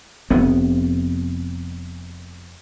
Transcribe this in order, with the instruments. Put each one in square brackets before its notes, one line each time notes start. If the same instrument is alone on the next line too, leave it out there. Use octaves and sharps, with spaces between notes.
[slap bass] F1 B3 C4